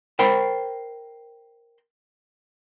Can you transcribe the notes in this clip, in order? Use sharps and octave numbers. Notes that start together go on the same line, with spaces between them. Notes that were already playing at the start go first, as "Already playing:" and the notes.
A#4 C5 G5 A5 B5